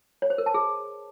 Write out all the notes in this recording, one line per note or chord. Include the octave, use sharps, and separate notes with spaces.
C#5
C5
A#4
A5
G#4